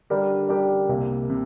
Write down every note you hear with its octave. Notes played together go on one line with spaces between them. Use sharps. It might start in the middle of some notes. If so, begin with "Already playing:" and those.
D3 G3 D4 G4 A#4
D3 G3 D4 G4 A#4
C2 C3 A#3
C3